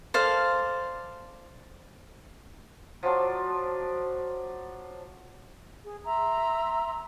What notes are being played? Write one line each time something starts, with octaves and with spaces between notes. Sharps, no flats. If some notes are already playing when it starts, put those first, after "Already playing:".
A4 C5 D5 F5
F3 F#3 D4
G#4
E5 A#5 C6 E6